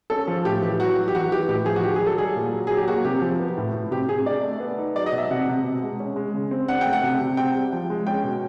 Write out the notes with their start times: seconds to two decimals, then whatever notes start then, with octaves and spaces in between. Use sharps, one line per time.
0.10 C#4 A4
0.28 F3
0.45 A2 G4
0.62 E3 G4
0.79 F#3 F#4
0.97 F#3
1.08 G4
1.15 E3 F#4
1.32 E3 G4
1.48 A2 G4
1.66 F3 G#4
1.76 F#4
1.84 D#3 G4
1.96 G#4
2.01 F#3
2.07 A4
2.18 G3 G#4
2.36 A#2
2.52 F#3
2.67 F#3 G#4
2.77 G4
2.88 A#3 F#4
3.05 C3 G4
3.22 F3
3.40 B3
3.57 A2
3.74 A2
3.91 C3 G4
4.08 C3 G#4
4.26 D4 D5
4.43 A3
4.60 B3
4.78 D#4
4.96 F#3 D5
5.06 D#5
5.13 B2
5.18 E5
5.30 C3 F#5
5.48 C3
5.64 B2
5.82 G#3
6.00 C#4
6.16 G#3
6.35 C#3
6.51 C4
6.68 D4 F#5
6.81 A3 G5
6.93 F#5
7.03 C3
7.21 C3
7.37 C4 G5
7.55 G3
7.73 F3
7.90 G#3
8.07 C#4 G5
8.24 B2